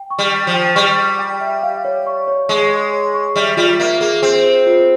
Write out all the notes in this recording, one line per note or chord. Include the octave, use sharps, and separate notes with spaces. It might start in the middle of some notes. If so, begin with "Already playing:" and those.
Already playing: G5
C#6
G3
G5
F3
G5
G3 C#6
G5
G5
E5
F5
C#5
C#6
C#5
G#3 C#6
C#5
C#5
C#6
G3 E5
G3 F4
A#3 E5
A#3 G#4
C4 G#4
G#4
F4